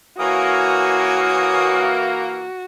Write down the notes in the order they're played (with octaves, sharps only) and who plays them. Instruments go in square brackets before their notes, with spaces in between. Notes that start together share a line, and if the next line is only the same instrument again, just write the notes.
[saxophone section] E3 A#3 [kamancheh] F#4 [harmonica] C#5 G#5 D#6